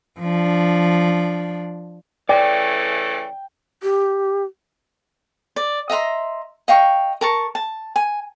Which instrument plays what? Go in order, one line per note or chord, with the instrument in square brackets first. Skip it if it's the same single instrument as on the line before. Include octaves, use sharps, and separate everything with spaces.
[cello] F3 D4
[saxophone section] C#3 E3 A3 [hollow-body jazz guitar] D5 [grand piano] G5
[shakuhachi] G4
[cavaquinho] D5
D#5 E5 A#5 C6
D#5 F5 G5 C#6
A#4 A5 C#6
A5
G#5